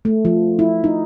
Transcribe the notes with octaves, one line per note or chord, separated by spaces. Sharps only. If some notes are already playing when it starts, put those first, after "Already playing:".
A3
F3
E4
D#4